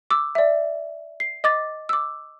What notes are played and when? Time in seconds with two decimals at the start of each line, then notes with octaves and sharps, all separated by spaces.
0.10 D6 E6
0.35 D5 E5
1.20 C7
1.44 D#5 D6 A6
1.89 D6 E6